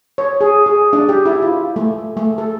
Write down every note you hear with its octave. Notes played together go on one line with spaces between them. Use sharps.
C#5
G#4
G#4
D4
G4
E4
F4
A3
A3
A4